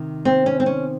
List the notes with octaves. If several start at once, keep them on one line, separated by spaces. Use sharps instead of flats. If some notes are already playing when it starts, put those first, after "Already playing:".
Already playing: C3 D#3
C4
C#4
C4
C#4